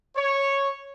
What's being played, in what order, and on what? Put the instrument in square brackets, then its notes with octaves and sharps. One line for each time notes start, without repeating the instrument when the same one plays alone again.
[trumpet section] C#5